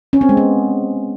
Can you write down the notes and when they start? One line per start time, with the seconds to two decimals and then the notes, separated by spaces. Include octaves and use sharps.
0.13 C#4
0.21 C4
0.29 G#3
0.37 B3